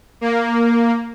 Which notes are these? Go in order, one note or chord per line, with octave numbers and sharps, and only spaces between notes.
A#3